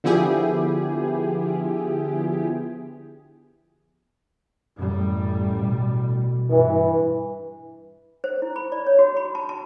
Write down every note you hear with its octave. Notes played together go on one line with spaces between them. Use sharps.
D3 F3 B3 E4 G4 G#4
A1 F#2 G3
B2
G2 E3
C5
E4
B5
D5
C#5
F#4
B5
A5
A5